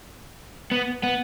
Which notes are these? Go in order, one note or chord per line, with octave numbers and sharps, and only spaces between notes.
B3
B3